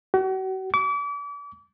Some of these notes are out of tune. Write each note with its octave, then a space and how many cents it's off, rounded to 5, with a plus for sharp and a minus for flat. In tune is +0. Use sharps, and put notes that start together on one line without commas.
F#4 +40
D6 -35